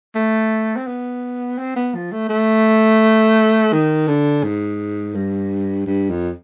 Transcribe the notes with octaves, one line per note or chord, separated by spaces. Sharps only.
A3
C4
B3
C4
B3
F3
A3
A3
D#3
D3
G#2
G2
G2
F2